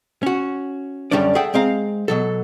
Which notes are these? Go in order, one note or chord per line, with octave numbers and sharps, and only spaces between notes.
C#4 F#4
F#2 D3 G3 C#4 D4 D5
G#4 A4 E5 F#5 G5
G#3 C4 F5 A#5
B2 F#3 A4